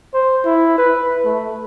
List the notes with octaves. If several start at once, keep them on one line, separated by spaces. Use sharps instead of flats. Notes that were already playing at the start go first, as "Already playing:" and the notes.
C5
E4
B4
A3